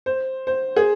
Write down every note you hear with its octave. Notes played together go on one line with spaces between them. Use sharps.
C5
C5
G#4